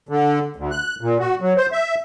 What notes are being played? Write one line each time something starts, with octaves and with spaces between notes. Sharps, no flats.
D3
D2
F#6
A#2
F#4
F#3
C5
E5